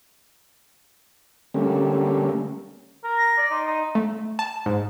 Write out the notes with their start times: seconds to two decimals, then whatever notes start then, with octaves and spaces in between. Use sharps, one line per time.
1.54 D3 G3 A3 A#3 C#4
3.04 A#4
3.18 A#6
3.38 D5
3.51 D#4 C6
3.66 D#4
3.95 A3
4.39 A5
4.66 G#2